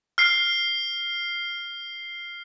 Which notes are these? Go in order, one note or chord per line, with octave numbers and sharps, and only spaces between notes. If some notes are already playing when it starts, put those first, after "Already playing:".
F6 C7